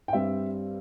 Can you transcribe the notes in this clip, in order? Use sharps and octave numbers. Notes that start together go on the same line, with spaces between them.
G5
G2 G3 C4 E5